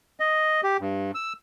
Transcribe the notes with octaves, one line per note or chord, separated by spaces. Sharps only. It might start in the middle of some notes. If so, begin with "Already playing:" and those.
D#5
G4
G2
E6